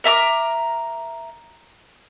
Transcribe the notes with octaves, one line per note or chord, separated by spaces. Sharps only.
A#4 E5 A#5 D6